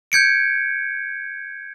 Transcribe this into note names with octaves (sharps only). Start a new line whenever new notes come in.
G6 G#6 C#7 D7